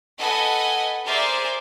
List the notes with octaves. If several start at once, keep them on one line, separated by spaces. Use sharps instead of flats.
A4 B4 D#5 F#5 G#5
G#4 A#4 C5 D5 E5